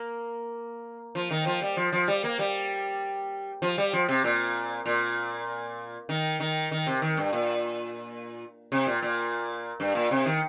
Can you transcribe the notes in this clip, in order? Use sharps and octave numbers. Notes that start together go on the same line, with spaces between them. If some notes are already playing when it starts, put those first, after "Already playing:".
Already playing: A#3
F3
D#3
F3
G3
F3
F3
G3
A#3
G3
F3
G3
F3
C3
A#2
A#2
D#3
D#3
D#3
C3
D#3
G2
A#2
C3
A#2
A#2
G2
A#2
C3
D#3